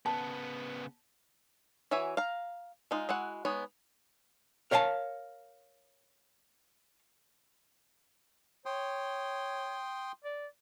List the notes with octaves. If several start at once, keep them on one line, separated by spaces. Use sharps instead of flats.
C#3 B3 A5
E3 F#4 C#5 E5 G#5
F5 A#5
G#3 D#4 F4
G#3 E4 F#4 F#5
G#3 B3 D#4 C#5
A#4 C#5 F5 G5 A5
C#5 G5 C6 D#6
D5